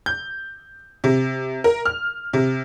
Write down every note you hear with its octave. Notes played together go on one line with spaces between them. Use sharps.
G6
C3
A#4
F6
C3